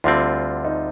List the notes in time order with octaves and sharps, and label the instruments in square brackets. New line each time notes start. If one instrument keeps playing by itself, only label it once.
[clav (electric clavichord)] D2 D3 G3 C4 [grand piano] F4
[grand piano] D#4